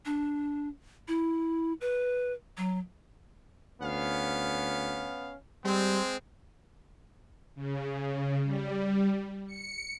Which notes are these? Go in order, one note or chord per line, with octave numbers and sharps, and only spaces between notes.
D4
E4
B4
F#3
D2 B3 C#4 F5
G3 G#3 C4
C#3
G3
C#7